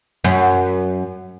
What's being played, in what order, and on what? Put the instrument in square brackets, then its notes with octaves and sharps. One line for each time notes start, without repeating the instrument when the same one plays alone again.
[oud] F#2